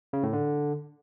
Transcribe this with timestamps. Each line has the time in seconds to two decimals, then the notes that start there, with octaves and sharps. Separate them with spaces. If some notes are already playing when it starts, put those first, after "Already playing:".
0.13 C#3
0.23 A2
0.33 D3